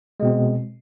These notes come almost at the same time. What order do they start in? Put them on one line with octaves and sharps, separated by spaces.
G#3 B2 C4